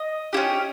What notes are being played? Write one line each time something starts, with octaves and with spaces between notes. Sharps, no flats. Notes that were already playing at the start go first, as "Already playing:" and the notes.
Already playing: D#5
C#4 E4 G4